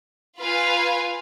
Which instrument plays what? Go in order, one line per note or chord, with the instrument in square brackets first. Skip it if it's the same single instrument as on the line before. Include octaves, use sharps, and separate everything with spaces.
[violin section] F4 B4 F5 G#5